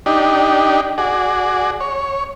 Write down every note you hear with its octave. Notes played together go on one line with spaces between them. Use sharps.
D4 D#4 G4
F#4 G#4 D5
C#5